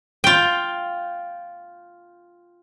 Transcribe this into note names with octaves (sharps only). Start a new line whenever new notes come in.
F4 G5